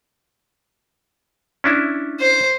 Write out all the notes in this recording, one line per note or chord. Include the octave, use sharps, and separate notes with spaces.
C#4 D4 E4
C5